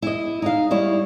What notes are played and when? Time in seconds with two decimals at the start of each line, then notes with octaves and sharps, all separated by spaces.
0.02 E4 D#5
0.42 D#4 D#5 F5
0.71 G3 E4 C#5 D#5